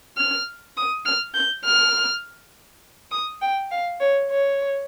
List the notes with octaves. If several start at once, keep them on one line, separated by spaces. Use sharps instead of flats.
F6
D#6
F6
G6
F6
D#6
G5
F5
C#5
C#5